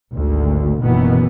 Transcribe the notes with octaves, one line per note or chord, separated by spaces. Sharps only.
G#1 D2
F#1 B2 D#3 E3 B3